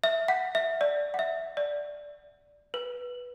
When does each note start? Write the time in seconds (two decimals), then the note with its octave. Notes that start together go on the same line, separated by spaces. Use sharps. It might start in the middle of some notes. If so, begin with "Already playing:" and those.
0.04 E5
0.28 F#5
0.55 E5
0.81 D5
1.14 F#5
1.19 E5
1.57 D5
2.74 B4